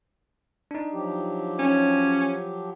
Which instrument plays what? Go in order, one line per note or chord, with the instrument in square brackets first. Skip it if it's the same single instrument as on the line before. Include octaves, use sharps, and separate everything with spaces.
[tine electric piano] D4 D#4
[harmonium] F3 F#3 G4
[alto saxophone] C#4